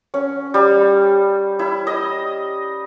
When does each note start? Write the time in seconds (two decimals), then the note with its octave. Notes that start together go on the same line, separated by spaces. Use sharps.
0.14 C#4
0.54 G3
1.59 E4
1.87 D#5